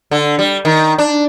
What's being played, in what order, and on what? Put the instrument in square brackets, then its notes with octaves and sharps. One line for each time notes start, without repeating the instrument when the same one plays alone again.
[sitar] D3
G3
D#3
D4